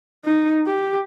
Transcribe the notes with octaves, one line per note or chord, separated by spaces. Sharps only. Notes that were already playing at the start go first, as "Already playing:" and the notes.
D#4
G4